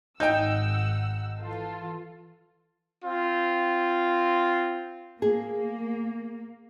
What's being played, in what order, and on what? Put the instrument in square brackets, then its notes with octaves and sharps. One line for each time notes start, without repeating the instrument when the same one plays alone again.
[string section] G#1 F#5 E6 [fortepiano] D#4 G5 [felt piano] D#5 G6
[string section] E3 F4 A4
[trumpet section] C4 F4
[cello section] A#3 [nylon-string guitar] G#4